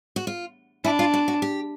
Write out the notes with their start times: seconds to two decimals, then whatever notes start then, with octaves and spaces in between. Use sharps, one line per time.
0.16 F#4
0.27 F4
0.84 D4 E4
0.99 F4
1.14 F#4
1.28 F#4
1.42 G4